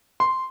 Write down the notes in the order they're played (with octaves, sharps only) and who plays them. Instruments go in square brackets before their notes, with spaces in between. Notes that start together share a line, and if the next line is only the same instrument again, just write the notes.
[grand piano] C6